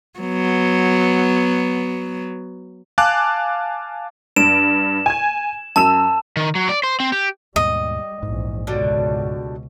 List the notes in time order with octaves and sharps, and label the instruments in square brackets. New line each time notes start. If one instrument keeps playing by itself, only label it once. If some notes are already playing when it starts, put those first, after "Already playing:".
[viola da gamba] F#3 B3
[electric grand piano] F5 G#5 A5 D6 F#6
[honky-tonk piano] G2 D7 [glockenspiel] E7
[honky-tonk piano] G#5 G#6
[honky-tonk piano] F#2 E6 E7 [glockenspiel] A5
[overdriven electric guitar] D#3
F#3
D5
C5
C4
G4
[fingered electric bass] D#2 G#2 B2 [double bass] G3 [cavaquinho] D#5
[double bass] A#1 E2 [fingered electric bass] G#2
[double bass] C#2 B2 [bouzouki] D3 F#3 G3